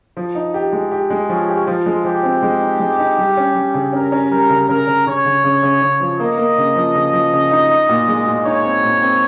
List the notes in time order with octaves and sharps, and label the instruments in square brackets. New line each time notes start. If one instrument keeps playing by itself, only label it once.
[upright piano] F3
D#4
G4
G#3
G4
G#3
[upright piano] F3 [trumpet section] C#4
[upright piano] G4
[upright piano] F3 [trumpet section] F4
[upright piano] G#3
[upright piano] F3 [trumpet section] G4
[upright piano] C4
G#3
D#4
G#3
D#4
G3
C#4
G3
C#3
[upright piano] C#4 [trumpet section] A#4
[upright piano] C#4
[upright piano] G3 [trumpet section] A#4
[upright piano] C#3
[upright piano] C#3 [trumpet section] A#4
[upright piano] C#3
[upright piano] C#3 [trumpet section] C#5
[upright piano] C#3
C#3
C#3
C#3
F3
[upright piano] A#3 [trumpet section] D#5
[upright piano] A#3
C#3
F3
C#3
F3
C#3
D#4
D#4
A#2
G#3
A#2
[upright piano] D#4 [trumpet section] C#5
[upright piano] C4
A#2
C4